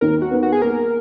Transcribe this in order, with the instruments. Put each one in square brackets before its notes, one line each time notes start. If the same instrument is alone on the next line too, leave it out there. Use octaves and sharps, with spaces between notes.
[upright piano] D#2 [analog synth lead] A#4
[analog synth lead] F#4
[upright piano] B3
[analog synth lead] F#4
G#4
[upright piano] A#3 [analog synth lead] A#4